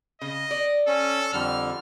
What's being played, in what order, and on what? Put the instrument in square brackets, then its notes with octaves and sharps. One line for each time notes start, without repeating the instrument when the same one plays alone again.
[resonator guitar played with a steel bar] C#3 [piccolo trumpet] D#5
[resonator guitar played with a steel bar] D5
[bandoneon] C#4 [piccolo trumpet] A4
[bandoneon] F2 D3 G3 [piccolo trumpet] F6